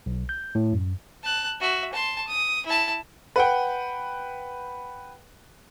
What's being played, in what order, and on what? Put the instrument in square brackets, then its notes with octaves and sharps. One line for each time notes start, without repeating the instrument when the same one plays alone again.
[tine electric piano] B1
G6
A2
F#2
[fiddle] A5 F#6
F#4 E5
A5 C6
D#6
E4 A5
[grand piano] B4 F#5 G5